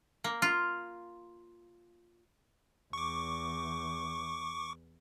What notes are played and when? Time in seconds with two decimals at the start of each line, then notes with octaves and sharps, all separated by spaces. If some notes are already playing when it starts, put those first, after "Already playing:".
0.24 A#3
0.42 F4
2.93 E2 C#6 D6